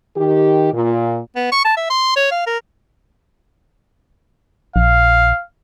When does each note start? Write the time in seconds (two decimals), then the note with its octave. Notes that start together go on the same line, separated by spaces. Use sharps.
0.17 D#3 G4
0.73 A#2
1.36 B3
1.52 C#6
1.65 A5
1.77 E5
1.90 C6
2.16 C#5
2.31 F5
2.46 A#4
4.76 A#1 F5